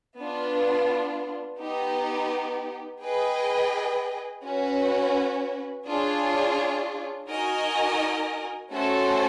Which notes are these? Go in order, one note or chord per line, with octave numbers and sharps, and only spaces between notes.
B3 D4 F4
B3 D#4 G4
G#4 B4 D#5 G5
C#4 F#4 B4
D4 F4 G#4 C#5
D#4 F#4 A#4 D#5 G#5
A3 C#4 F#4 A4 C5